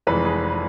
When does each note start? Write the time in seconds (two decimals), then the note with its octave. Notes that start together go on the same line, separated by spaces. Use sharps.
0.07 F1 F2 E3 G#3 B4
0.25 G#4